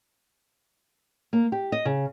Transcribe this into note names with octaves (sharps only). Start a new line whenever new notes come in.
A#3
G4
D#5
C#3